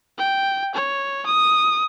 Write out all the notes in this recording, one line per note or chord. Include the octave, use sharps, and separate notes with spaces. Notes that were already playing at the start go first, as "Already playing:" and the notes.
G5
C#5
D#6